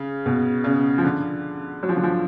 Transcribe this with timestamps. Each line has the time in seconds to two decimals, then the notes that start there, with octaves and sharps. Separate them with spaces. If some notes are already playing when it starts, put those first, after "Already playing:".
Already playing: C#3
0.26 B2
0.64 C#3
0.98 F3
1.04 D3
1.83 F#3
1.89 F3
1.96 D3
2.03 F3